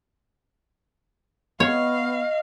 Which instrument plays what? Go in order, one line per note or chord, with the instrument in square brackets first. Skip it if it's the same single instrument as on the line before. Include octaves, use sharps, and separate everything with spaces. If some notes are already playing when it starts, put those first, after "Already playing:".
[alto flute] B3 [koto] C#5 [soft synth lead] D#5 [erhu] F5